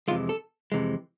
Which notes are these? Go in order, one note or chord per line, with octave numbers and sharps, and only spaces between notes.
F2 C3 E3 G#3 F4
A4
F2 C3 E3 G#3